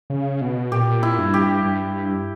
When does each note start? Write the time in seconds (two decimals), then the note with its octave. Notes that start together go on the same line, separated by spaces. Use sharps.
0.10 C#3
0.41 B2
0.72 A#2 G4
1.03 E4
1.18 G2
1.34 G4
1.65 G2